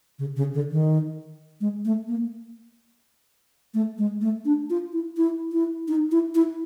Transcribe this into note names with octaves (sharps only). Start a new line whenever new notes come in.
C#3
C#3
D3
D#3
G#3
A3
A#3
A3
G#3
A3
D4
F4
E4
E4
E4
D#4
E4
E4